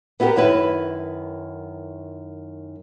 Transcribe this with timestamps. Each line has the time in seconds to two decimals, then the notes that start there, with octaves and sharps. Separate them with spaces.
0.20 B3 E4 F#4 G4 A#4
0.36 F#2 D#3 E4 B4